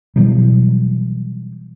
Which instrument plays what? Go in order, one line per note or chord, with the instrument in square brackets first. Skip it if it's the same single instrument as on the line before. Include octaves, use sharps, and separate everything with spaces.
[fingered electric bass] B2 E3 F#3 G3